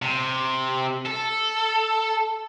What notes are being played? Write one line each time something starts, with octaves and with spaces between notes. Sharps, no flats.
C3
A4